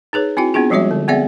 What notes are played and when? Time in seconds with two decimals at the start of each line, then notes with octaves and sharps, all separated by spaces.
0.13 D#4 G#4 B4 C#5
0.37 C4 E4 F#4 G5
0.54 B3 C4 D4 F4 G#4
0.70 F3 G3 G#3 F#4 C#5 E5
0.91 D3
1.08 B3 C4 G#4 D5 E5 F#5